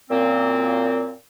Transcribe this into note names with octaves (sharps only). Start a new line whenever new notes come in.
F#2 A#2 C4